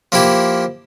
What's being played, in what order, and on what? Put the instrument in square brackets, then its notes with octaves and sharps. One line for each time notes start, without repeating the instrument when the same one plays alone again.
[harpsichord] F3 A#3 E4 G4